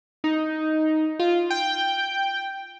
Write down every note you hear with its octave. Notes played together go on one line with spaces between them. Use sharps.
D#4
F4
G5